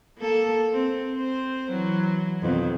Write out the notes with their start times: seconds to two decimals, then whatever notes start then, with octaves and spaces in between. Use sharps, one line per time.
0.19 A#3 A4
0.73 C4
1.11 C4 C5
1.70 E3 F#3
2.42 F2 B2 D#3